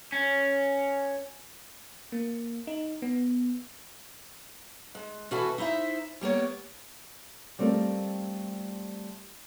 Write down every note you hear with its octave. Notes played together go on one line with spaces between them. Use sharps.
C#4
A#3
D#4
B3
G#3
B2 E3 F#4 A4 B4 G#5
D#4 E4 C5 E5
G3 A#3 B3 C#5
G3 A3 C4 F4 G4 A#4